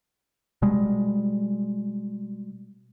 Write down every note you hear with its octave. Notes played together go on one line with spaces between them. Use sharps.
B2 G3 G#3